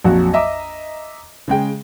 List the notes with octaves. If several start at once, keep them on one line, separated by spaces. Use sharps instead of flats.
A#1 F2 F#3 F#4
D#5 E5 A#5 D6
C#3 G#3 G5